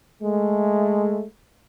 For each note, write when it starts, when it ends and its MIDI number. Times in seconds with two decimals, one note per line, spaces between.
0.22 1.25 56
0.22 1.25 57